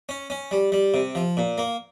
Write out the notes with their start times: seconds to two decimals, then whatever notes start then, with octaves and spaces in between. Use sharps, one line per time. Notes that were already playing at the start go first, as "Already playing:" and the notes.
0.09 C#4
0.30 C#4
0.51 G3
0.72 G3
0.94 C3
1.15 F3
1.37 A#2
1.58 A#3